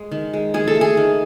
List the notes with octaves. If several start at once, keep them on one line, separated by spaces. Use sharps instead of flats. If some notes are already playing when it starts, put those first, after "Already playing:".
Already playing: G#3
D#3
G#3
D#3 G#4
A4
A3
G#4
D#3